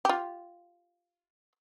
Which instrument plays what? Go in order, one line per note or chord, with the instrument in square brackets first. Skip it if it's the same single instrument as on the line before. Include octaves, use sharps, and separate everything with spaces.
[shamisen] F4 G4